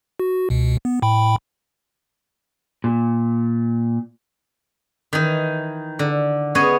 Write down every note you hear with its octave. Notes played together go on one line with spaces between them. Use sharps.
F#4
C#2 B2
B3
A2 G5 B5
A#2
D#3 E3 D#4
D3
B3 C#4 G#4 C#5 D#5